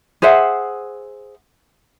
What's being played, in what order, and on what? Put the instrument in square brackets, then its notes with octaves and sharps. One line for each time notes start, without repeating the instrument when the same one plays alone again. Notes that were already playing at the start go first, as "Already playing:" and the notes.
[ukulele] G#4 C5 E5 F#5